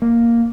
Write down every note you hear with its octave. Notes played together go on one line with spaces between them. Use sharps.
A#3